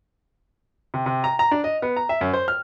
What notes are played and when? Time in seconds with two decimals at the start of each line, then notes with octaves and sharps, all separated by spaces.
0.94 C3
1.06 C3
1.24 A#5
1.39 A#5
1.51 D4
1.64 D#5
1.82 B3
1.97 A#5
2.09 E5
2.21 F#2
2.33 C5
2.48 F6